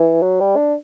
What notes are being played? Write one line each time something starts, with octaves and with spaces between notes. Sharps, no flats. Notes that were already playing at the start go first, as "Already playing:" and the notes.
Already playing: E3
F#3
G3
D4